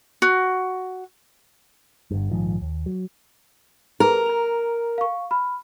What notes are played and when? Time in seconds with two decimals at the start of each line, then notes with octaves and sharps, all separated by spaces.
0.22 F#4
2.11 G1 G2
2.31 A#1 G#2 D#3 F3
2.61 D#2
2.86 F#3
4.00 G#4 A#4 B4 A#5
4.26 A#5 F7
4.98 F5 C#6
5.31 B5 F6